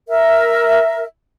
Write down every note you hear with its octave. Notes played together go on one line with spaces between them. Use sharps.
A#4 E5